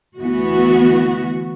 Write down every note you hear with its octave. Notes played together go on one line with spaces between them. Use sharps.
D2 E3 B3 F#4